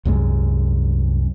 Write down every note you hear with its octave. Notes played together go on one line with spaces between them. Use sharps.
C2 F#2 G#3